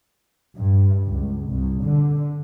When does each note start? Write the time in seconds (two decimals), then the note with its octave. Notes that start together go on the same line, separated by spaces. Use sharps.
0.56 G2
1.08 C#2
1.48 C2
1.83 D3